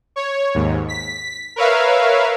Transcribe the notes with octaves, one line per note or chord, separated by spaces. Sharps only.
C#5
D#2 G#2
B6
A#4 B4 C#5 E5 F5